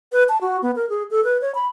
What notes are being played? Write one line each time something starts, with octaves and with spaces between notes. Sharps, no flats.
B4
A5
F#4
B3
A#4
G#4
A4
B4
C#5
B5